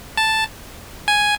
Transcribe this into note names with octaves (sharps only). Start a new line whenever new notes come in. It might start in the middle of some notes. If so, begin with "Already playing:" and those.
A5
G#5